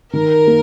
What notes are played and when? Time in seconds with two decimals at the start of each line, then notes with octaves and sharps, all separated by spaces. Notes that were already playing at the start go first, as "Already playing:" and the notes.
0.13 D#3 A#4
0.47 A#3